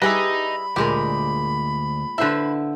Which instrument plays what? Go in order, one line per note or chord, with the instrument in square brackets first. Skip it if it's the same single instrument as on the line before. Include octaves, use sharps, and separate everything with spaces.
[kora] G3 [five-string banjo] E4 G#4 B4 [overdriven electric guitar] D#5 A#5 [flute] B5
[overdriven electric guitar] D2 [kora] A#2 G#3 A#4 [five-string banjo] G4
[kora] D3 C5 E5 [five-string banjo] E4 B4